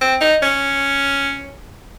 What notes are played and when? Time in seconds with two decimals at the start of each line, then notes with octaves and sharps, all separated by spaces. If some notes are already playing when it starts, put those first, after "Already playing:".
0.01 C4
0.21 D#4
0.43 C#4